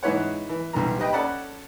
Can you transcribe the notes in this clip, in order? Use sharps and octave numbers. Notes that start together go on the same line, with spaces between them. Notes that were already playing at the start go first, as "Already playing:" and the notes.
G#2 E3 E4 B4 C#5 F#5
E3
B1 G2 E3 A#5
G4 B4 D#5 G5
C#4 A4 D5 F#5 A5 B5